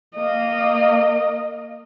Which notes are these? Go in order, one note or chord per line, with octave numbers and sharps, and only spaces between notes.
A#3 D#5